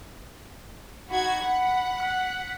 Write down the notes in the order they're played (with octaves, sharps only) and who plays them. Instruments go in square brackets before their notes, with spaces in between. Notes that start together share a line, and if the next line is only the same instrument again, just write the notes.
[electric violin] D#4 B5 [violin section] F#4 G#6
[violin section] F#5 [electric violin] B5
[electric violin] F#6 B6